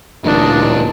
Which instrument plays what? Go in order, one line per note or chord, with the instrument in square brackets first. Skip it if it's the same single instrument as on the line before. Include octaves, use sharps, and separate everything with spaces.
[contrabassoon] D1 [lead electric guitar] E2 A#2 [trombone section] D4 D#4